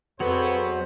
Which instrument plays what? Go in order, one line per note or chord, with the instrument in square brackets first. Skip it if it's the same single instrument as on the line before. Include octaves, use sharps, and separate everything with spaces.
[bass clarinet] F2 [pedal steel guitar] F#3 F#4 [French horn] B3 [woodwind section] G#4 A4 C5